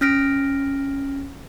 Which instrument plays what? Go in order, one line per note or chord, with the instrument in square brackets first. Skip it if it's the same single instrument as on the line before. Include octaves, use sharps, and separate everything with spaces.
[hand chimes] C#4 F6 A#6 B6 D7